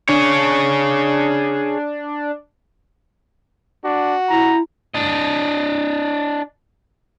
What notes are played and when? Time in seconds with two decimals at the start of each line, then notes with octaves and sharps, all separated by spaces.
0.09 D4 G#4 C#5
3.85 D4 F#4
4.30 E4 A#5
4.94 D4 D#5